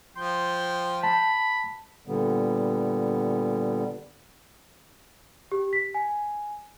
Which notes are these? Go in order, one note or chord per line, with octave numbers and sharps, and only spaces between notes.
F3 G5 C6
A5 B5
A#2 D3 G3 B3
G4
B6
G#5